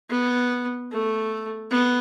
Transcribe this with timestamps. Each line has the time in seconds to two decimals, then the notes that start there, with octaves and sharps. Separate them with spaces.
0.10 B3
0.91 A3
1.71 B3